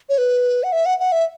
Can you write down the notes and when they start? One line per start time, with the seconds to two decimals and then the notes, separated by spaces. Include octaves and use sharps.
0.09 C#5
0.18 B4
0.63 F#5
0.72 E5
0.86 F#5
1.00 F#5
1.12 E5